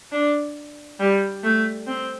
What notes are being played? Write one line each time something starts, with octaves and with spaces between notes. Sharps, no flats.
D4
G3
A3
C4